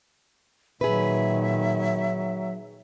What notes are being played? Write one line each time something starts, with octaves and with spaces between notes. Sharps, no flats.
A#2 D#3 F#3 G#4 B4 E5